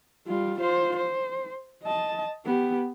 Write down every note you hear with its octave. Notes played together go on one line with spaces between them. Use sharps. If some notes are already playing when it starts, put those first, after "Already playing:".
G3 F4
F4 C5
C5
D#5 A5
B3 G4